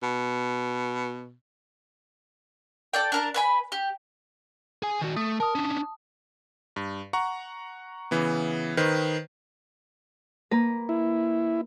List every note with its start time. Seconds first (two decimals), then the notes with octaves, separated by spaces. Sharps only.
0.03 B2
2.93 A4 D5 G5
3.12 D4 A#4 A5
3.34 B4 G#5 B5
3.72 G4
4.82 G#4 G#5
5.01 D#3 F#4
5.16 A3 D#6
5.40 A#4 A5 D#6
5.55 C#4 D4
6.76 G2
7.13 F#5 A#5 C#6
8.11 C#3 E3 B3
8.77 D#3 B4 C5
10.51 A#3 B4 A#5
10.89 E4